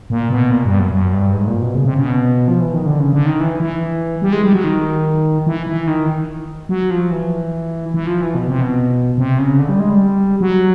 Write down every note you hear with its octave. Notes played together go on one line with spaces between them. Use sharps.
A#2
B2
A#2
G2
F#2
F#2
G2
G#2
A#2
B2
C#3
C3
C#3
B2
F3
E3
D#3
D3
C#3
D3
D#3
E3
E3
G3
G#3
G3
F#3
D#3
E3
E3
D#3
F#3
F3
E3
E3
F3
E3
B2
C3
B2
C3
C#3
D3
G3
G#3
G3
F#3